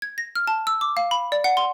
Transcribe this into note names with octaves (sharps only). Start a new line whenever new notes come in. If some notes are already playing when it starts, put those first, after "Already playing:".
G#6
A#6
F6
A5
E6
D6
F5
B5
D5
F#5
C6